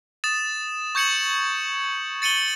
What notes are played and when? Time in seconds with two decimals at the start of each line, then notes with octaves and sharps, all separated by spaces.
0.24 D#6 A6 E7
0.95 C#6 G6 G#6 C#7 E7 F#7
2.22 A6 C#7 D#7 F#7 G7